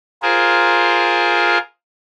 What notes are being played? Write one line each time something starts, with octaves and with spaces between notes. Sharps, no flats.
F4 G#4 A#4 C5